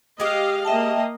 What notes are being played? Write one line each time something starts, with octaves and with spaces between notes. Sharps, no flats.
G#3 G4 D#5 F5
A#3 D#5 E5 G5 A5